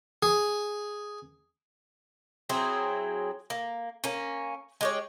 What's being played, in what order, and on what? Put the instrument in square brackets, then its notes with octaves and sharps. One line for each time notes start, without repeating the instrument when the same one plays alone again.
[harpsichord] G#4
[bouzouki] F#3 C4 E4 G#4
A#3
A#3 C#4
G#3 G4 C#5